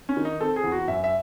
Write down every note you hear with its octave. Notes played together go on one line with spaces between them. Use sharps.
C#4
D#3
D#4
C4 A4
G#4
E2
F#4
F#2 E5
E5